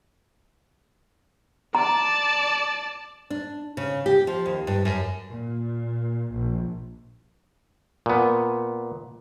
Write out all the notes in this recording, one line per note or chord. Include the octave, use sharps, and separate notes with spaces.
D5 A5 A#5
D4
C#3
G4
F3
D#2
G2
F#2
A#2
A#1
A#2 B3